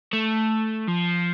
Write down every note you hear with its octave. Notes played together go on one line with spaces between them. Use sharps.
A3
F3